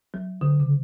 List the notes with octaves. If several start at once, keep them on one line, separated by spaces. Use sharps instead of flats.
F#3
D3
C#3